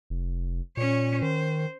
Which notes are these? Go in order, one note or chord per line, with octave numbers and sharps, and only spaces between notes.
F1
A#2 C#4 C#5
D#3 C5